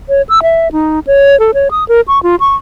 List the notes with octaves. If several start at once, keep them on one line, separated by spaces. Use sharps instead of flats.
C#5
E6
E5
D#4
C#5
A4
C#5
D#6
A#4
C#6
F4
C#6